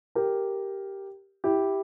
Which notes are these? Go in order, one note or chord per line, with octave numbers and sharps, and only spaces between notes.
G4 A#4
E4 G4